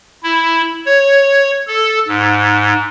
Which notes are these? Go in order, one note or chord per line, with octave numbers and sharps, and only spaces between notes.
E4
C#5
A4
G#2